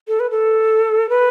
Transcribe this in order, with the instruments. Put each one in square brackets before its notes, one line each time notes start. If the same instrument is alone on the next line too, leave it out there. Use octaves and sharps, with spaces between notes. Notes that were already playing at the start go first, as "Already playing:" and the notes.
[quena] A4
B4
A4
B4